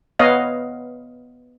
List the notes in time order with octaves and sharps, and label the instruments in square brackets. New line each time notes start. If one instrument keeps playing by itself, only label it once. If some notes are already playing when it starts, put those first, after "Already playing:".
[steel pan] B3 B4 C#5 D#5 F5